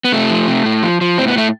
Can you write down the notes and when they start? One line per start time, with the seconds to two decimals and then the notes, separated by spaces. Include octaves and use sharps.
0.05 B3
0.12 C3 A3
0.30 F3
0.48 C3
0.66 A2
0.83 F3
1.01 F3
1.18 A2 C4
1.28 B3
1.36 A2 A3